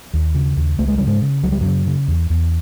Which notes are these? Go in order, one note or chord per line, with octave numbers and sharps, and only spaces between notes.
D#2
C#3
D#2
C#2 A3
G#3
C#3 G3
G#2 G#3
C#3
C#2 F#3
G3
F#2 C#3 F#3
C#3
E2
E2